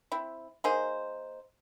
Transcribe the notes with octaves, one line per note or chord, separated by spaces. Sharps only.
C4 E4
A#3 D#4 G#4 C5